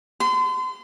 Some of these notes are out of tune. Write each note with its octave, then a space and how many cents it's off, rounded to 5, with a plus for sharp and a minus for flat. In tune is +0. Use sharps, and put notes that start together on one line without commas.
C6 -40